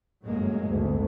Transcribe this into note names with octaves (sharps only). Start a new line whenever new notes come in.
G1 F#2 A2 F#3 G#3 A#3
G#1 D2